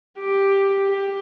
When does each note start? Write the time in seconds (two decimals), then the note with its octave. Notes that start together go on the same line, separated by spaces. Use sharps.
0.18 G4
0.87 G4